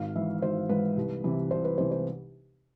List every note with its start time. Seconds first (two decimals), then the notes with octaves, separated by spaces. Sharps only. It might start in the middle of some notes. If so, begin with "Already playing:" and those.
Already playing: G#1 F5
0.15 G#2 E3 E5
0.42 G#1 C5
0.69 G#2 E3 B4
0.97 C2
1.24 C3 E3
1.51 C2 C5
1.64 B4
1.78 C3 E3 C5
1.91 C5